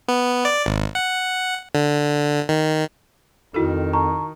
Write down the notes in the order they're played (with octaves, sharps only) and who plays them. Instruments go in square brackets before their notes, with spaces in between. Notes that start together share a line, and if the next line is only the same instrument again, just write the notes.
[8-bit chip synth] B3
D5
G#1
F#5
D3
D#3
[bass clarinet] F2 [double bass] D#3 [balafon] E4 F#4 A4
[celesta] A5 A#5 C#6